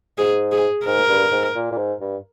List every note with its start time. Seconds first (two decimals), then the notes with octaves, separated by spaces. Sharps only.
0.18 G#2 G#4
0.52 G#4
0.86 G#2 A#4
1.09 G2
1.32 G#2
1.55 A#2
1.72 A#2
1.78 G#2
2.00 G2